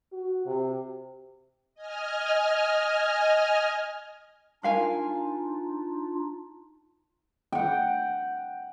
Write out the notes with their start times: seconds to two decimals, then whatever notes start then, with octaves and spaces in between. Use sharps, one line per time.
0.13 F#4
0.46 C3
1.75 D#5 G#5 F6
4.63 D4 D#4 F4 A#4 F5 G#5
7.52 F#5 G5